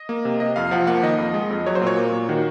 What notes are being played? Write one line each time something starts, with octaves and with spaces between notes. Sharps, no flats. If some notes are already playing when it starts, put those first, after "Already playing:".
Already playing: D#5
A#3
C3
C3 D#5
F2 F5
F3 F#5
A#3 F#5
D#3 D#5
F2
G#3
F2
F#3 C#5
C5
A#2
C#5
A#3
A#2
D#3 F#4